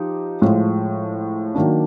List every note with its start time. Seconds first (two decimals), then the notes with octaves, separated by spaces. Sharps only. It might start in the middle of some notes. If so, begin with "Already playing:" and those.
Already playing: F3 D#4 G4
0.42 A2 F3 G#3
1.55 D#3 F#3 A#3 D4